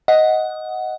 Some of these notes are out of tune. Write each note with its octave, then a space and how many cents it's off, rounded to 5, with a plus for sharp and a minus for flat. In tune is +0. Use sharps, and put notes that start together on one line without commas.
D#5 +10 F#5 +0